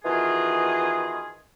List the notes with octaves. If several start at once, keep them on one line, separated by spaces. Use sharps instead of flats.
B2 D#3 E3 F4 G#4